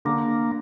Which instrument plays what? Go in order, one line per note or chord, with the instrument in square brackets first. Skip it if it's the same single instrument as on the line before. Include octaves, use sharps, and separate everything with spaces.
[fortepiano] D3 [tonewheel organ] A#3